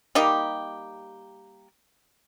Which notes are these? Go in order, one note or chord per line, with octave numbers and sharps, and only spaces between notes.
G3 A#3 D#4 G4